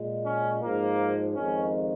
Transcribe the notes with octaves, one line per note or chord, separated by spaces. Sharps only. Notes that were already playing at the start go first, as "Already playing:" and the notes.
Already playing: A#2 G#3
C#4
G#2 F3 G#3 A#3
F2 D#3 G#3 C#4